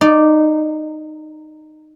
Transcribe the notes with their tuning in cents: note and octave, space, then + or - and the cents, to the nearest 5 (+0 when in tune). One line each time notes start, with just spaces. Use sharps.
D#4 -15 D5 +5